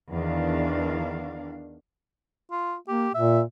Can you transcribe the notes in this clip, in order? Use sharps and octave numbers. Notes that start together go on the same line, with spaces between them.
E2 D#3 D4 F5
F4
A#3 G4
A#2 E5